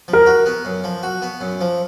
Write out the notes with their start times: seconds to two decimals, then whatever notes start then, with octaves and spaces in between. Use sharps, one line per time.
0.08 F3
0.13 A#4
0.26 F#4
0.46 B3
0.65 F#2
0.84 F3
1.03 F#4
1.22 B3
1.41 F#2
1.61 F3